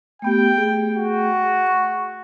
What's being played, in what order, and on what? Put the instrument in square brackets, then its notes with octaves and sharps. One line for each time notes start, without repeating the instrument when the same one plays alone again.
[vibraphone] A3 B3 G4 [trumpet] G5
[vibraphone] A3 G#4
[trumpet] F#4
[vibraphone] C#6